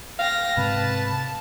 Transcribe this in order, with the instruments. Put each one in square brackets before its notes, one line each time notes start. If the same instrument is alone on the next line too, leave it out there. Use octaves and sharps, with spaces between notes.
[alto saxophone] F5 [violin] G5 A#6
[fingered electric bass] G#2 C3 [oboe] B4 [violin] A5